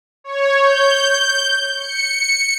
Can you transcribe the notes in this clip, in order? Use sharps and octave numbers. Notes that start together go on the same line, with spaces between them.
C#5
G6
C#7